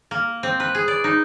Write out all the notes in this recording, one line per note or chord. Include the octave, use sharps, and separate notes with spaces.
A#3
C4
B4
G#4
D5
D#4